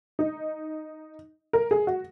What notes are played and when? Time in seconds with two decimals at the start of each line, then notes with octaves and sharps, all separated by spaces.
0.19 D#4
1.53 A#4
1.71 G#4
1.87 F#4